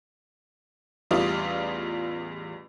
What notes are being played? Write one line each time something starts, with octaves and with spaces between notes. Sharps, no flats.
A1 E2 G3 F4 D5 D#6